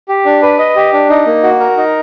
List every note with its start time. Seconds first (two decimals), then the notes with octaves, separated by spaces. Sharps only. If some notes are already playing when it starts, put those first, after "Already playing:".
0.09 G4
0.25 D4
0.42 B4
0.59 D#5
0.76 G4
0.93 D4
1.09 D#4
1.26 A#3
1.43 F#4
1.60 A#4
1.77 D#4